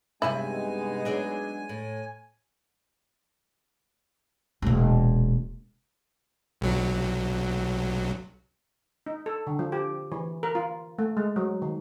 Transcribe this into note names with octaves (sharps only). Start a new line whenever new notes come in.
G2 C3 G#3 B3 D#4 E4 E5 G#5
F#3 D4 G#4
A2
E1 A#2
B1 F#3
D#4
A4
D3
F3
G4
E3
A#4
F4
A3
G#3
F#3
D#3